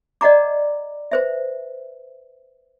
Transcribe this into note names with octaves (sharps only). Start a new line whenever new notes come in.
D5 D#5 F#5 A#5 D6
B4 C5 E5